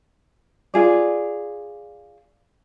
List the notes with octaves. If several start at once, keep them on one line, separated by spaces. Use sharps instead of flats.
F4 G#4 D5